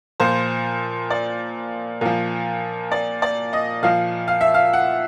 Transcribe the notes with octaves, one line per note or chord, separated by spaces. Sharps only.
A#2 F3 C5
D5
A#2 F3
D5
D5
D#5
A#2 F3 F5
F5
E5
F5
F#5